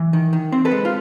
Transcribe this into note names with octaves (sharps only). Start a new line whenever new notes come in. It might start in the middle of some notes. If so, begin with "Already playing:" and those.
Already playing: E3
D#3
D#3
C4
A4 B4
G#3
F4